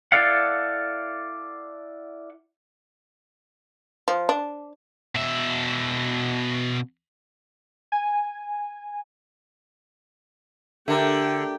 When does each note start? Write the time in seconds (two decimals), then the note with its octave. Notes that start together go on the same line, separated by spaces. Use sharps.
0.12 E4 A4 D5 F5 F#5
4.08 F3
4.29 D4
5.15 B2 E5
7.92 G#5
10.88 D3 A3 G4 A#4 G5